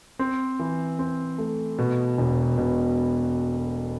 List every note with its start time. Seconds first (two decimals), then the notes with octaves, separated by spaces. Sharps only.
0.19 C4
0.59 E3
0.99 C4
1.38 A3
1.78 B2
2.18 E1
2.58 B2